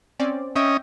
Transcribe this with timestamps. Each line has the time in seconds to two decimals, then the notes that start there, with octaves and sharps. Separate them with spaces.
0.20 C4 C#4 D5
0.56 C#4 D#5 E5 G5